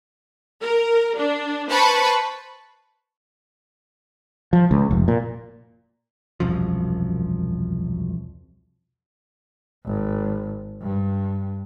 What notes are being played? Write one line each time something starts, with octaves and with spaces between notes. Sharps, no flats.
A#4
D4
B4 C5 A5 B5 C#6
F3
C#2
F1
A#2
E1 C2 F#2 F3
G#1
G2